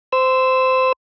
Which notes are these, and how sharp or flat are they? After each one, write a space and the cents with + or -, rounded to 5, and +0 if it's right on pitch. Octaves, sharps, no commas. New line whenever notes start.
C5 -15 E6 +0